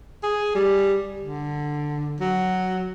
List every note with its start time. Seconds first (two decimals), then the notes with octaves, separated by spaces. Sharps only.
0.23 G#4
0.55 G3
1.20 D3
2.20 F#3